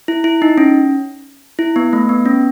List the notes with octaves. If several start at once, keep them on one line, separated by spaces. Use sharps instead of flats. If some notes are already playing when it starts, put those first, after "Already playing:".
E4
E4
D#4
C#4
E4
B3
A3
B3
C#4